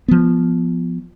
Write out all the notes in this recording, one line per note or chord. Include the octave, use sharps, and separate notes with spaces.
F3 B3